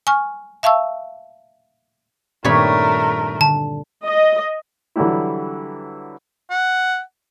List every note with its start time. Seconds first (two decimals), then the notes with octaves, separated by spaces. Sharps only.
0.07 G#5 C#6 F6
0.63 E5 F5 A5 C#6 E6
2.44 G2 A#2 D#3 A3 C4 A#4 C#5 B5
3.41 D3 A5
4.06 D#5
4.96 D3 E3 F#3 G3 E4
6.50 F#5